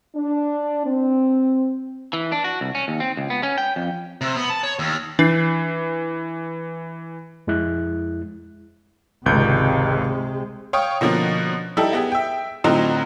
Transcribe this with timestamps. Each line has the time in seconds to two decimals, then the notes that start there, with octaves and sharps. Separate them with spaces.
0.16 D4
0.87 C4
2.13 E3
2.32 D4
2.44 F#4
2.61 C2
2.75 C#4
2.88 D#2
3.00 C4
3.17 C#2
3.30 B3
3.43 C#4
3.58 G5
3.76 F2
4.21 C3
4.36 B3
4.50 A5
4.64 C#5
4.79 D#2
5.19 E3 D4 C7
7.47 F2 G#3 E4 F#6
9.26 G#1 C#2 C3 G#3 G6
10.73 C#5 F5 G5 C#6 D#6
11.01 B2 D3 F3 A#3 C#4
11.77 G3 D#4 E4 G4 A4
11.93 B3 G4 G#4
12.12 E5 G5
12.64 A2 D3 F#3 C4 D#4 F4